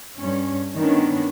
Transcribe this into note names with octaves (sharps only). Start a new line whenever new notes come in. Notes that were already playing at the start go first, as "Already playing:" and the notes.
G2 C#4
D#3 B3 C#4 D4